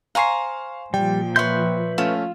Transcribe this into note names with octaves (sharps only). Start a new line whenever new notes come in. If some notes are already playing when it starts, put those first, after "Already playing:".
C5 F5 G#5 A#5 C#6 C7
A#2 F3 G3 G5
B4 C#5 E5 C6 G6
A3 C#4 F4 E7